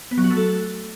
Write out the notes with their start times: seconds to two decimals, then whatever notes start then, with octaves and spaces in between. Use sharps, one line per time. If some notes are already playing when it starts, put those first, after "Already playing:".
0.11 B3
0.18 F#3
0.24 F#4
0.30 A3
0.37 A4